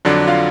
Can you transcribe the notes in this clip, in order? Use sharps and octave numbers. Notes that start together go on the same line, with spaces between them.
F2 D3 F#3 D4 D5
F4 F5